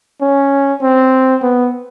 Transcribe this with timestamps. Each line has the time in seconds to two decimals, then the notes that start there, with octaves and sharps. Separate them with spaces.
0.21 C#4
0.82 C4
1.42 B3